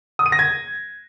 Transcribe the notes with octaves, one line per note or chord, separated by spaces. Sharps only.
D#6
D#7
A#6
G#6